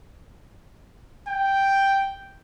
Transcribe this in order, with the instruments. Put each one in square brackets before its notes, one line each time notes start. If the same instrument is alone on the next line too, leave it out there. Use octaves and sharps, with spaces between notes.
[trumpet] G5